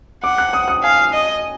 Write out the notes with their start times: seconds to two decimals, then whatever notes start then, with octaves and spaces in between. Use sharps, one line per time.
0.24 F#5 D6
0.38 F#6
0.53 D#6
0.68 D#6
0.83 F5 G#5
1.13 D#5